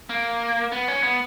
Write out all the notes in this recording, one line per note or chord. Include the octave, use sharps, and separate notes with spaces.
A#3
B3
C#4
B3